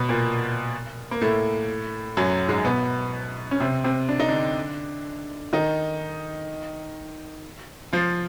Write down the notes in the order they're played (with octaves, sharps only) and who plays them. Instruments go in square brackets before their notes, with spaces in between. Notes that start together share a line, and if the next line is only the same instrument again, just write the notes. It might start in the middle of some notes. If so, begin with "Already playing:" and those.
Already playing: [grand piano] B2 B3
A#2 A#3
A#3
A2 A3
F#2 F#3
G#2 G#3
B2 B3
C#4
C3 C4
C3 C4
D4
D#4
D3 D4
D#3 D#4
F3 F4